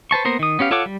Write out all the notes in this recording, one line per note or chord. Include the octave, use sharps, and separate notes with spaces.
B4 C5 A5 C#6
A#3 B3 A#4 C5
D#3 D#6
B3 C#4 G4 F5
F4 A4 C#5 F#5 D6
G3